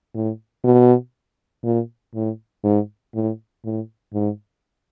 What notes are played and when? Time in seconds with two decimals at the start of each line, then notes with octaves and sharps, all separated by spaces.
0.15 A2
0.64 B2
1.64 A#2
2.14 A2
2.64 G#2
3.14 A2
3.65 A2
4.14 G#2